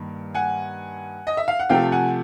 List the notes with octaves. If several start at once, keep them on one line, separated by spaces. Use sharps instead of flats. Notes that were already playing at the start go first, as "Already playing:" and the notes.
Already playing: G2 D#3 A#3
F#5 G#5
D#5
E5
F5
F#5
C3 F3 A3 F5 G5
F#5 G#5